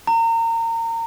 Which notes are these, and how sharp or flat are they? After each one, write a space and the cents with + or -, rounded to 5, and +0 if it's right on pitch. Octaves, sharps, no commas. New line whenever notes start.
A#5 -30